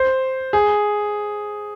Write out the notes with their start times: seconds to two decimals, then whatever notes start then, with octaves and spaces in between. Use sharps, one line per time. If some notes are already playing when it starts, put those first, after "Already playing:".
Already playing: C5
0.53 G#4